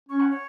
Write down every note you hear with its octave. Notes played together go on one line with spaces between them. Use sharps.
C#4 C#6
F#5
C#5